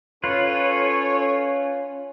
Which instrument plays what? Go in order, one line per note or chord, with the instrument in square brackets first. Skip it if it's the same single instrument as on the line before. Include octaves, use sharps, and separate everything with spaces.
[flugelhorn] C#4 [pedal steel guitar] F4 B4 [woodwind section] A4 C#5